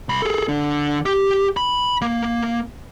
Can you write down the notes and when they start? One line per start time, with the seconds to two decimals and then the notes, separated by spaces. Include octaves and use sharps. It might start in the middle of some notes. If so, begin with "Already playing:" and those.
0.09 C2 B5
0.22 G#4 A4
0.48 D3
1.06 G4
1.57 B5
2.02 A#3